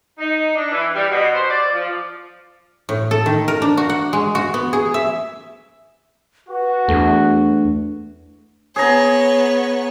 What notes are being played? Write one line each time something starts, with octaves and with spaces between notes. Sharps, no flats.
D#4
D4
E3
G3
B2
C5
D5
F3
A2
A4
D#3
A#4
D4
F#4
F#5
G#3
F#4
B3
G#4
E5
F#4 B4
E2 A3 D4
B3 G#4 C#5 A#5